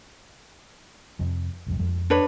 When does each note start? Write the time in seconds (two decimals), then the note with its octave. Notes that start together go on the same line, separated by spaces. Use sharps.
1.19 F2 C3 F3
1.67 F1 C2 F2
1.79 F2 F3 G#3
2.10 D4 B4 C#5